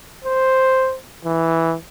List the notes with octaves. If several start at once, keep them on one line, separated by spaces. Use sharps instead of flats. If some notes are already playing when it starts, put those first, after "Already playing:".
C5
E3